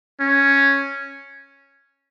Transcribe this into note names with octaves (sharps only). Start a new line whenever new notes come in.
C#4